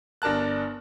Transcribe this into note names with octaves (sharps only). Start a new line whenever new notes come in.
G1 D4 A#4 A5 F#6